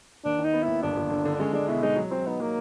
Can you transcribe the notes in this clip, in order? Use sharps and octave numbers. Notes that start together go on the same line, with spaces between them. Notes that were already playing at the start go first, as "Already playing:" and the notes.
D#2 D4
D#3
D#4
B3
D#2 E4
G1 D4
G1
D3
D3
D4
G#3 C#4
G#3 D4
B2 E4
G#3 D#4
F#3
F#3 C4
B3 D#4
F#3 A#3